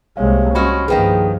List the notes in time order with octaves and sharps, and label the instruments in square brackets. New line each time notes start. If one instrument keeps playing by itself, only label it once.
[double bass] C2 G#3 [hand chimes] A#3 C#5 F5
[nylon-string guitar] G#3 F#4 G#4 [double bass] C#4 [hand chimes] B5 F6
[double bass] G2 F3 [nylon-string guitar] D#3 A#3 B3 [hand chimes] G#4 G5